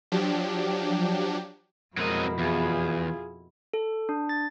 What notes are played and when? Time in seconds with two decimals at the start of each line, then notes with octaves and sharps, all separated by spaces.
0.12 F3 F#3 D4 G4
1.97 F2 B2 F#3 G#3 C4 E4 A#4 D#5
2.39 E2 F4 G#4
3.74 A4
4.09 D4
4.29 A6